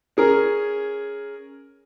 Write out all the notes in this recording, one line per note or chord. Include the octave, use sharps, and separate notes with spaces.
C#4 G#4 A#4